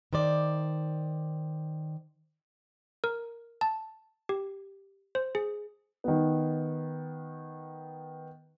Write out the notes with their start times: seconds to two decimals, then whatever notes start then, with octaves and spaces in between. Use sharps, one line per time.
0.13 D#3 C5 D5
3.04 A#4
3.61 A5
4.29 G4
5.15 C5
5.35 G#4
6.04 D#3 B3